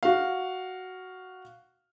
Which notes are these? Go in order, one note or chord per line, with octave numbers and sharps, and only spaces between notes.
F#4 F5